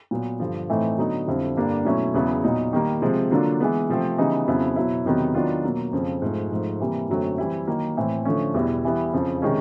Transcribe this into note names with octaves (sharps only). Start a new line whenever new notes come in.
A#2 F#3 B3
G2 D3 F3
A2 E3 A3 C4 D#4
D3 F#3 B3 D#4
F2 D3 G3 C4 E4
G2 D3 G3 A#3 D4
B2 F#3 A3 C#4 E4
E2 C#3 F#3 B3 E4
A#2 F#3 B3 D#4
D#3 G3 A#3
C3 F3 G#3
D3 F#3 A#3 D4 F4
E3 G#3 B3
C3 F3 A3 C4
C#3 E3 G3 B3 D#4
F2 C#3 F#3 B3 E4
B2 F#3 B3 E4
E2 C3 D#3 F#3 B3
D#3 F#3 B3 D4 F4
B2 F#3 A#3
F2 C#3 F3
G#2 F3 A3
G#2 F3 A3
C3 E3 G3 A#3
F#2 D3 F#3 A3 C4
E3 G3 C4 E4
D#3 F#3 A#3
A2 E3 A3 C4 E4
D3 F3 A3 C#4
E2 B2 G3 B3 E4
E3 G3 B3 E4
F2 C#3 F3
C3 D#3 G#3 C#4